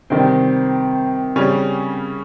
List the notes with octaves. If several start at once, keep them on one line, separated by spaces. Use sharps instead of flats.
C3 D#3 G3 C4
C#3 G3 C#4